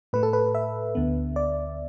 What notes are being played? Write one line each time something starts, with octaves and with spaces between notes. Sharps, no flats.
A2 A3 B4
A4
B4
E5
D2 D3 B3
D5